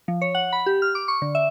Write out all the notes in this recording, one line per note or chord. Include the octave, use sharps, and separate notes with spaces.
F3
C#5
F#5
B5
G4
F6
D6
C#6
D3
E5